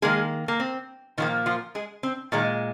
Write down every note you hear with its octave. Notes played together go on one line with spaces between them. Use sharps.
D#3 G#3 A#3 G#4
A#3
C4
A#2 D#3 F3 A#3 D#4
F3 F4
G#3 G#4
C4
A#2 D#3 G#3 D#4